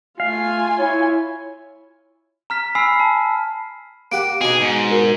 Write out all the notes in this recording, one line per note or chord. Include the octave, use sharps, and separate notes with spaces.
A3 F4 F5 G#5
E4 C#5
A#5 F6 B6
G#5 B5 E6 C7
A5
A#3 G4 F#5 D7
B2 D#4 G#4
G#2
F#4 A#4